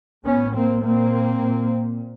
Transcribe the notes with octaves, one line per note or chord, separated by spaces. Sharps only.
A2 B3 C#4
A#3 C4
A#2 A#3 C4
A#2